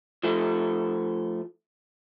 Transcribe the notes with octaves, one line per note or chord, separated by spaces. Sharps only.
F3 A3